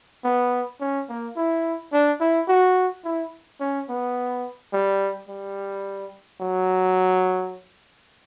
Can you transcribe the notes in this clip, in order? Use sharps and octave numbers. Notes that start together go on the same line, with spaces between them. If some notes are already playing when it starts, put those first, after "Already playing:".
B3
C#4
A#3
E4
D4
E4
F#4
E4
C#4
B3
G3
G3
F#3